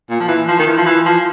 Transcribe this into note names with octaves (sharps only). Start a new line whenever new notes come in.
A#2
F3
E3
F3
D#3
E3
F3
E3
F3